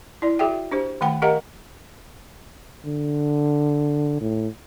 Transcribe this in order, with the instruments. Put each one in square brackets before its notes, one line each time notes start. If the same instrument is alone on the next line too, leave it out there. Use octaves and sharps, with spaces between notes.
[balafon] E4 D5
F#4 G#4 E5 G5
D4 G4 C5
D#3 A3 F#5 G5 B5
G4 A#4 D#5 F5 F#5 A#5
[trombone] D3
A2